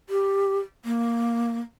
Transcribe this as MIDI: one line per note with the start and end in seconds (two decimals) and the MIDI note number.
0.09 0.59 67
0.85 1.59 58